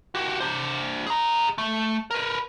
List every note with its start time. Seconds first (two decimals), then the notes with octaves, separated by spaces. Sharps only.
0.15 F#4 G4
0.40 D4 C5
1.07 G#4 A#5
1.58 A3
2.11 A#4 B4